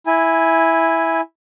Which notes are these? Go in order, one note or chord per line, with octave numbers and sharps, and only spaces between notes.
E4 G#5